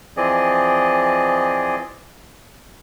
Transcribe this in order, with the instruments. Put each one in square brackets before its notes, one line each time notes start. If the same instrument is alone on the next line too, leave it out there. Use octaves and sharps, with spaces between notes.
[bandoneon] E3 F3 C4 G#4 D5 D#5